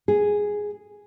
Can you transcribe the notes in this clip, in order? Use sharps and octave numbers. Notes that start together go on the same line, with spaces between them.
G#4